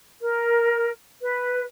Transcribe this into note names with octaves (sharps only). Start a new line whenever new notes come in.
A#4
B4